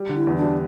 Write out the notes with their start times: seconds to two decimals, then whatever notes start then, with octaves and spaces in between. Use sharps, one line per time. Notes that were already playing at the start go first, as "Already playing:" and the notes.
Already playing: G3
0.09 D3
0.15 E4
0.27 E2
0.37 D4
0.42 G3